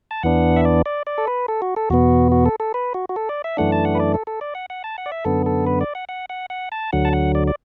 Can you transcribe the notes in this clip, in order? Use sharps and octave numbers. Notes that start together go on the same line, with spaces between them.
A5
E2 E3 B3 D4 F#5
E5
D5
D5
D5
A4
B4
A4
F#4
A4
E2 B2 B3 F#4
F#4
A4
A4
B4
F#4
F#4
A4
D5
E5
F#2 E3 A3 D4 F#5
A5
F#5
B4
D5
A4
A4
D5
F#5
F#5
A5
F#5
D5
E5
F#2 D3 B3 A4
A4
B4
D5
F#5
F#5
F#5
F#5
A5
D2 D3 F#3 F#5
A5
F#5
D5
D5